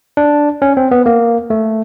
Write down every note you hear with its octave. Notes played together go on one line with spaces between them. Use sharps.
D4
C#4
C4
B3
A#3
A3